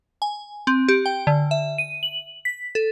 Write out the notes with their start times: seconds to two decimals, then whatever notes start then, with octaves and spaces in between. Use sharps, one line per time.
0.22 G#5
0.67 C4
0.88 G4
1.06 G5
1.27 D3
1.51 E5
1.78 D#7
2.03 F#7
2.45 B6
2.75 A4